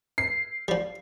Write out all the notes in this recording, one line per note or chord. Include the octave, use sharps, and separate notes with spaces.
C7
F3 G3